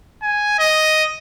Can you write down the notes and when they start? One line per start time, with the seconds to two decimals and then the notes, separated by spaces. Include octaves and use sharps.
0.23 G#5
0.59 D#5